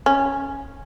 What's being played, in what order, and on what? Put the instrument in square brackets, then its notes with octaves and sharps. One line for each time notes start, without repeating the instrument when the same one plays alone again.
[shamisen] C#4